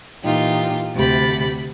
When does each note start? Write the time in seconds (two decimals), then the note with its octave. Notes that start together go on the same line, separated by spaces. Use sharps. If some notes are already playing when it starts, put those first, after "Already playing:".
0.23 A#2 E3 D#4 F4 G4
0.95 D2 C3 G4 B5 A6